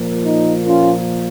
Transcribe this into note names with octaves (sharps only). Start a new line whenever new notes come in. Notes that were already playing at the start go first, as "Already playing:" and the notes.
Already playing: A#2 F3 A#3
D#4
C#4 F4